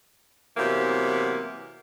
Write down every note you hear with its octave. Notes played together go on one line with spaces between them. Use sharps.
C3 E3 F#3 A#3 B3